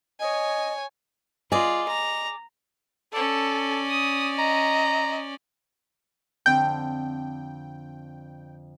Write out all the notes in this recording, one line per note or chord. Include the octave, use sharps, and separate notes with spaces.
C#5 D#5 G#5
F4 G#4 D5 D#5
A#5
C#4 A4 D5
D#6
D#5 A#5
F2 D3 C4 G5